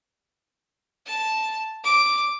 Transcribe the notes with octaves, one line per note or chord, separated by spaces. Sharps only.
A5
D6